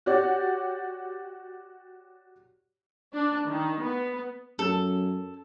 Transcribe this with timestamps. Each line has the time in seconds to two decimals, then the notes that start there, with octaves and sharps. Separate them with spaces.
0.06 F#4 G4 C#5 D5
3.14 D4
3.46 D#3
3.83 B3
4.59 F#2 A4